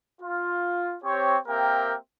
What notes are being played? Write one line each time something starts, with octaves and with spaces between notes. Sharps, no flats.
F4
C4 G4 C#5
A#3 C4 G4 A#4 E5 G5